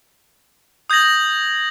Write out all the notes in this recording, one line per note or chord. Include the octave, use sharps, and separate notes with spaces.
D#6 G6 G#6 A#6 F#7